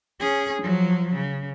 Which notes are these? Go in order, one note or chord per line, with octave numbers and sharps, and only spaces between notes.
C#4 G#4
F3 F#3
C#3